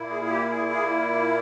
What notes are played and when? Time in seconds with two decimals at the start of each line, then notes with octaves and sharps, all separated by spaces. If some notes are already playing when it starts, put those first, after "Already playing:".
Already playing: A#2 A#3 E4
0.10 G#4
0.24 G#4
0.30 G4
0.50 G#4
0.70 G#4